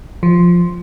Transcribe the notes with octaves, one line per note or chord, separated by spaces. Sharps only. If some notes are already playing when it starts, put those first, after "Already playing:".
F3